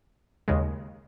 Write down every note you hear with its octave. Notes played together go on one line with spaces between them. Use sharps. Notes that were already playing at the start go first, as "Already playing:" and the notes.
D#2 C#3 G#3